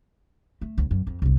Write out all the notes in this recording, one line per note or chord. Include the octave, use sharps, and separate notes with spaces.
A3
D2
F#2
F2
G1 C2